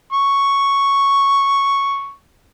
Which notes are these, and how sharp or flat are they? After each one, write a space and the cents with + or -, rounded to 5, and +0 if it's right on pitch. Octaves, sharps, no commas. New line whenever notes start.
C#6 +0